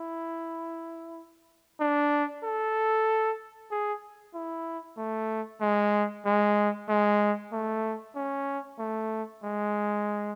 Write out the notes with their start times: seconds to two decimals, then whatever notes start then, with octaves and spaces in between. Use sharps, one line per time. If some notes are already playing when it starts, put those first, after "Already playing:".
Already playing: E4
1.80 D4
2.43 A4
3.71 G#4
4.34 E4
4.97 A3
5.61 G#3
6.25 G#3
6.89 G#3
7.52 A3
8.15 C#4
8.79 A3
9.43 G#3